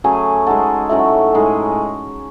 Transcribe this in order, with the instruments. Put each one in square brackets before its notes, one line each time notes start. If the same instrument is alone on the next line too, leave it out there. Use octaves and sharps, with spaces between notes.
[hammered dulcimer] F#3 A3 C#4 G#4 [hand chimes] G#5
[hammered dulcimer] G#3 D#4 A4 [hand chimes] F#5
[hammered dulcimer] A2 F#3 A3 C#4 [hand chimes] E5
[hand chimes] F#5
E5
[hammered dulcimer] A2 G#3 D#4 G#4